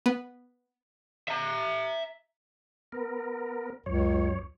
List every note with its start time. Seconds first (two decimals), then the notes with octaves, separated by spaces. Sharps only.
0.06 B3
1.29 E5 A#5
2.92 B3 A#4
3.86 C#2 F#2 C#5